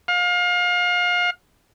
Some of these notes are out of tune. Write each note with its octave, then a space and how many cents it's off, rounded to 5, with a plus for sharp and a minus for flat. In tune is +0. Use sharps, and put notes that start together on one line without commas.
F5 +30